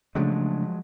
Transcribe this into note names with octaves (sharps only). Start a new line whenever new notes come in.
C#3 F3 F#3 G#3 A3 D4